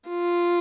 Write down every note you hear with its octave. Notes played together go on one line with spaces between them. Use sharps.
F4